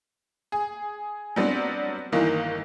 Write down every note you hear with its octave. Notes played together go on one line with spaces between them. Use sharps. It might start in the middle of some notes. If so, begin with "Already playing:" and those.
G#4
F#3 G3 B3 C4 D4
G1 D#3 E3 A#3 D#5